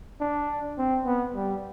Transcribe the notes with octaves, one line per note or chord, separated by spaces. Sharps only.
D4
C4
B3
G3